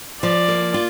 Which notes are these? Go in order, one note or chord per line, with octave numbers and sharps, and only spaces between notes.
F3 D5
A#3
F4